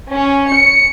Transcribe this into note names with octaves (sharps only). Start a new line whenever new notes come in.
C#4
C#7